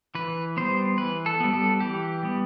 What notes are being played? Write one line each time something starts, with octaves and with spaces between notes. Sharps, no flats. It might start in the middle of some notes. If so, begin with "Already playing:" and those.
E3 B4
G3 B3 C5
E3 B4
A4
G3 B3
A4
E3 G4
G3 B3